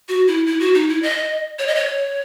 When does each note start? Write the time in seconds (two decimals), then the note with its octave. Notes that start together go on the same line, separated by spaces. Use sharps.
0.09 F#4
0.28 E4
0.47 E4
0.60 F#4
0.75 D#4
0.89 E4
1.02 D#5
1.59 C#5
1.67 D#5
1.76 C#5